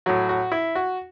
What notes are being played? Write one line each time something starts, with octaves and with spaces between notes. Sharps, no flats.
A2 F#3 F#4
F#4
E4
F#4